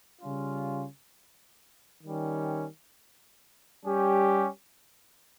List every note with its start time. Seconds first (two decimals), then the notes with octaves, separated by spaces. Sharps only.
0.22 C#3 G3 C#4 F4
2.03 D#3 G3 C#4
3.84 G3 C#4 G4